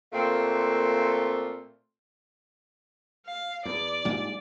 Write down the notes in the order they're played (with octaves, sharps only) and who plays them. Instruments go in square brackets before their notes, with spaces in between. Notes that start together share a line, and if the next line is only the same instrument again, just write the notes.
[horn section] A#2 A3 A#3 C4
[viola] F5
[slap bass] E2 [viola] D5
[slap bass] A#1 G#2 G3